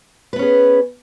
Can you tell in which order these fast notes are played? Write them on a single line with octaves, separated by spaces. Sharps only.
B4 B3 C#4 G#4